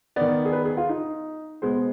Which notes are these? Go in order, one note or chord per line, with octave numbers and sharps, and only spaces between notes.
D#3 B3 D5
G#4
B4
G#4
F4
D#4
B2 G#3 B3 C5